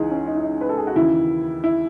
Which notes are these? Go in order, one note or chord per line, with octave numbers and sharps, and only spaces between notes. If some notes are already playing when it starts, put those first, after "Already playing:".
Already playing: C#2 E3 D#4 G#4
C#4
D#4
E4
D#4
B4
A4
G#4
F#4
D#2 C#3 E3 E4
E4